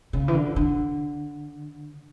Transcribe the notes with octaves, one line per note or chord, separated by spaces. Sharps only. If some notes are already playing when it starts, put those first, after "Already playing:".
C#3
E3
D3
D3